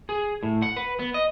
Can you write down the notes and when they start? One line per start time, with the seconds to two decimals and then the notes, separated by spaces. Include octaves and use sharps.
0.09 G#4
0.43 A2
0.62 F#5
0.77 B4
0.99 B3
1.14 D#5